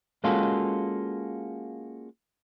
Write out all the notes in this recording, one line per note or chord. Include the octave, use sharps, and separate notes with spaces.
G#3 A#3 C#4 F4 F#4 A4